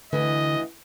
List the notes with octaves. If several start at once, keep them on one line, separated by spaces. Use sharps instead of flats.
D2 D3 E3 D#5